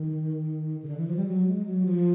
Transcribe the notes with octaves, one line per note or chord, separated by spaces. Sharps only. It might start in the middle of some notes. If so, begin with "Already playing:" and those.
Already playing: D#3
C#3
D3
E3
F3
G3
F#3
G#3
F#3
F3